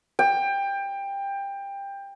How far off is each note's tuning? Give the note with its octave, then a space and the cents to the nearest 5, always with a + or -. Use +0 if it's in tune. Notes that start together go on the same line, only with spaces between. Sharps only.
G5 +20